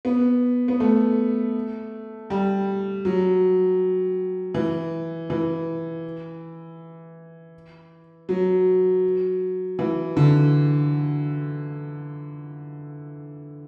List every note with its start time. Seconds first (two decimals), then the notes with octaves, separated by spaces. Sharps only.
0.05 B3
0.68 B3
0.80 A3
2.30 G3
3.05 F#3
4.55 E3
5.30 E3
8.29 F#3
9.79 E3
10.17 D3